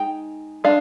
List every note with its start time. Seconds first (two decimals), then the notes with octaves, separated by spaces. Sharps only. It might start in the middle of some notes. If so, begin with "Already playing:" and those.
Already playing: G#3 D#4 G5
0.64 G#3 D4 F5